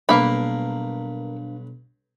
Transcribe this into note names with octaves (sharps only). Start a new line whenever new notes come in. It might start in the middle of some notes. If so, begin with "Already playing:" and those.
B1 G2 A#3 D4 F5 B5